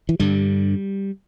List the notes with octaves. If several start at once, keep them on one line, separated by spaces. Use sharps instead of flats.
E3
G2 D3 G3